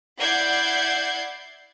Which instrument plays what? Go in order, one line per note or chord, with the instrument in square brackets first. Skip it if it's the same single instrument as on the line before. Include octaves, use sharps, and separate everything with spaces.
[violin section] E4 D5 F#5 G6 G#6 C7